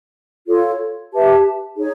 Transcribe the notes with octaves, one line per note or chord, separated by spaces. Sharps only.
F4 A4 C#5
G4 B4 E5 A5
D#4 G#4 C#5